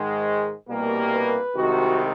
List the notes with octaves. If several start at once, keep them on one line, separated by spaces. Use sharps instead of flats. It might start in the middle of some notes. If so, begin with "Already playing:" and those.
Already playing: G#2 D#3 G#3
C2 B2 G3 A#3
B4
C2 C3 D#3 G#3 F#4